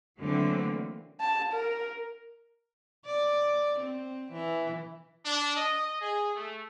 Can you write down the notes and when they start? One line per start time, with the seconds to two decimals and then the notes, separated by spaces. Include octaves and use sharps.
0.20 D3 E3 F#3 A3 A#3 C4
1.20 A5
1.53 A#4
3.06 D5
3.79 C4
4.32 E3
5.26 D4
5.57 D#5
6.01 G#4
6.36 A3